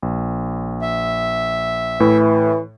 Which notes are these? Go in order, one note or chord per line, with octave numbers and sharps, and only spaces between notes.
A#1
E5
A2 E3